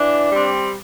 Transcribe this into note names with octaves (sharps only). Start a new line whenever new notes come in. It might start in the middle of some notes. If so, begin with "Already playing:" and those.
Already playing: E3 D4
G3 C4